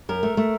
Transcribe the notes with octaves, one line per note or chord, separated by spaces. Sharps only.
F#2 A#4
A3
A3